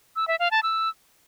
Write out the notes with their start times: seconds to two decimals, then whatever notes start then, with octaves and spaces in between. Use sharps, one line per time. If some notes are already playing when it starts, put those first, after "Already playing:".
0.16 E6
0.28 E5
0.39 F5
0.51 A5
0.63 E6